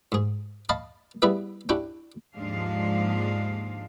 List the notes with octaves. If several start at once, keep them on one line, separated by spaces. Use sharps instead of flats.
G#2 G#4
D#5 F5 A5 B5 C#6
G3 B3 E4 G#4 B4 E5
C#4 D4 E4 F#4 G4
D#2 G#2 F3 G#3 D4 F5